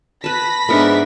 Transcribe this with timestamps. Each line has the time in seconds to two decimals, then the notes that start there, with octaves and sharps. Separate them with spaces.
0.24 B4 A5 B5 A#6 B6
0.69 G#2 B3 D4 A#4 E5 F#5